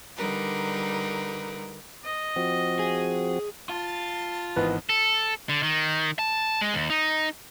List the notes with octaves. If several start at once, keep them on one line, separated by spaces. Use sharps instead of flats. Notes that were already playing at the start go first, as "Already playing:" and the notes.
D3 G3 D#4 A#4 B4
D#5
F3 C4 F#4
G#4
F4 A5
G#1 E3 B3 B4 D#5
A4
D3
D#3
A5
G#3
D#2
D#4